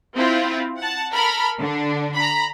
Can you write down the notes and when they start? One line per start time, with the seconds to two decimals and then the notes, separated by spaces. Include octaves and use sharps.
0.15 C4 E4 F4
0.78 F#5 A5
1.13 A4 A#4 B5 F6
1.60 D3 D4
2.16 A#5 B5